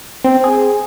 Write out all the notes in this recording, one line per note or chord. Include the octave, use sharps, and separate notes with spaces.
C4
G#4